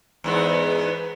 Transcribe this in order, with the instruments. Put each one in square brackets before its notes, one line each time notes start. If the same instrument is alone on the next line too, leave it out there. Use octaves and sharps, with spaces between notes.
[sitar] E2 G#2 B3